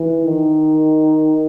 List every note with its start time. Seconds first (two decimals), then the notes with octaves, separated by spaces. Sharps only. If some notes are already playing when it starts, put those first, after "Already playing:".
Already playing: E3
0.25 D#3